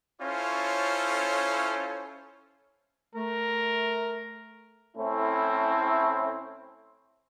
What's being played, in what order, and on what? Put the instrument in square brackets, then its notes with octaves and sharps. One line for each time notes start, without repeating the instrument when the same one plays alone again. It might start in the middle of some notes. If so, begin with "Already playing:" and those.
[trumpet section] C#4 E4 F4 A4 C5 C#5
[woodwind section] A3 [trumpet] A#4
[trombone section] A2 A3 C4 C#4 E4